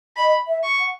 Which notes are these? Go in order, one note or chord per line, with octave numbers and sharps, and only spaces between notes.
D#5 B5
E5
C#6
F#5